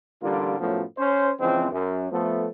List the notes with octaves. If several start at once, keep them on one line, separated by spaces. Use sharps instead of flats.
A1 D3 G3 A#3 F4
F#2 A2 F3 F#3 A3 B3
C#4 C5
C#3 E3 F3 G#3 C4
F#2
F3 A3 B3